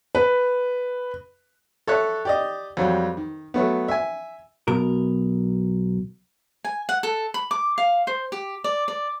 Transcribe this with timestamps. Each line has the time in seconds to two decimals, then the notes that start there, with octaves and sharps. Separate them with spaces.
0.15 B4
1.87 A4 C#5 E5 F#6
2.25 G4 D5 D#5
2.77 F2 F#3 G3
3.17 D#3
3.54 F#3 A3 B3
3.88 E5 G#5
4.68 B1 B2 A#4
6.65 G#5
6.89 F#5
7.03 A4
7.34 B5
7.51 D6
7.78 F5
8.07 C5
8.32 G4
8.64 D5
8.88 D5